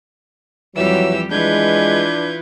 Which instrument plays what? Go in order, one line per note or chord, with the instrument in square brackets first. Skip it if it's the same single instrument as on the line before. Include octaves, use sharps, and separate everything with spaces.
[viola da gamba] F2 G3 G4 [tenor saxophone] E3 [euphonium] F#3 [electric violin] E6
[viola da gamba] E3 F4 B4 [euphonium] G#3 [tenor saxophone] D4 [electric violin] G6 G#6